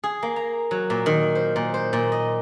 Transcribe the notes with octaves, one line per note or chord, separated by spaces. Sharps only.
G#4
A#3
A#5
F#3
A#2
D#3
C5
A#2
C5
A#2
D#5